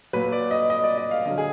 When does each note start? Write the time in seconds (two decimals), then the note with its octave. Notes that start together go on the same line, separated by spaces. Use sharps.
0.13 A#2 F#3 B4
0.32 D5
0.51 D#5
0.70 D#5
0.84 D5
0.98 D#5
1.11 F5
1.25 D3 F#3 D#5
1.38 G#4